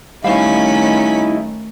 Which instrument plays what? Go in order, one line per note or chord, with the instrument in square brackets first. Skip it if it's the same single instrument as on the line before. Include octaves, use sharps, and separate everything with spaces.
[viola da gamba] D#3 A3 [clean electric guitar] G3 F5 [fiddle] C#4 B5 [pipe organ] D#4 E4